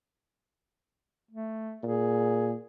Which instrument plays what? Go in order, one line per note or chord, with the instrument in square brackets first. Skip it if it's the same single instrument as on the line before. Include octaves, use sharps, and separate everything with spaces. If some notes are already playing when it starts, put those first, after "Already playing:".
[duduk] A3
[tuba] A#2 [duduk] G#4